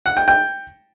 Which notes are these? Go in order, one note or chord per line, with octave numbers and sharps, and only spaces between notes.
F#5
G5
G5